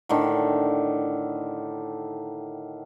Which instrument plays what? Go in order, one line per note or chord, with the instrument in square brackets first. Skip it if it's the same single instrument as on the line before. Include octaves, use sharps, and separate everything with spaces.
[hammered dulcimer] A2 D3 D#3